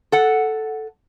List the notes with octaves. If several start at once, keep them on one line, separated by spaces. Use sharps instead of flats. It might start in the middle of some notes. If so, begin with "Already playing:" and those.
A4 F#5